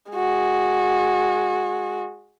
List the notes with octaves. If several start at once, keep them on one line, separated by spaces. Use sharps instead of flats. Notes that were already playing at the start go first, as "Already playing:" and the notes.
G#3 F#4